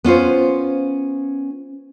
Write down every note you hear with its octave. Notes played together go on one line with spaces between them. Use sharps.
B3 C#4 F4 C5